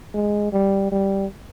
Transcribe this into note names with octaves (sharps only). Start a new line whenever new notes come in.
G#3
G3
G3